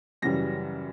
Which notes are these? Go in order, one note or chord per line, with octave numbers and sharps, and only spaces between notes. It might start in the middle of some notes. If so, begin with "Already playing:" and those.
F#2 C#3 E3 G3 A#6